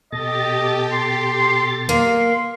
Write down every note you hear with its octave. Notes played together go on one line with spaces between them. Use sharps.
B2 G4 A4 D#5 A6
C6
A#3 C6